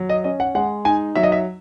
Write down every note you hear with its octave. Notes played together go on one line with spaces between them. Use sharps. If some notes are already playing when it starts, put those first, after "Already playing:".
Already playing: F#3
D#5
C#4 D#5
F#5
G#3 F#5
D#4 G#5
F#3 E5
D#5
E5